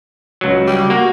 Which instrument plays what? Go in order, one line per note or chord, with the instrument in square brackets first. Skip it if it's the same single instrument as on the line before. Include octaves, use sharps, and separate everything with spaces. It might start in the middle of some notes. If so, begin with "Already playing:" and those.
[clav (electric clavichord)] C#2 F#3
[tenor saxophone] G3
[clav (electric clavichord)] A#3 [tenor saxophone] F#4